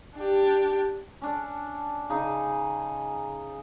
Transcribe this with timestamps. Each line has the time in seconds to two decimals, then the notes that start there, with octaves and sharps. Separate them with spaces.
0.16 D4 G4
1.21 C#4 D4 A4
2.10 C#3 D#4 G#4